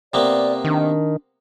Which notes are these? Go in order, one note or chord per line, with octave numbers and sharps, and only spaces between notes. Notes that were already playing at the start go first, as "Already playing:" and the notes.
C3 A#3 B3 D5
D#3 D4